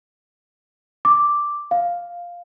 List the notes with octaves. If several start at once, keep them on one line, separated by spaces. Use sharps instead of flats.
D6
F5